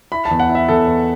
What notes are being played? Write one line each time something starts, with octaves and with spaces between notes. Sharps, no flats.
E4 B5
A5
E2
F#5
E4
E5
E2 A4
E2